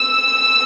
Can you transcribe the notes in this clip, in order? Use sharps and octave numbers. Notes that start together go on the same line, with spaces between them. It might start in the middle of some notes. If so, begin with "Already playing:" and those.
Already playing: E6